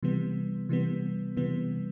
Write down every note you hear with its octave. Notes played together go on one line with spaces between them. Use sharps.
C3 E3 G3 B3
C3 E3 G3 B3
C3 E3 G3 B3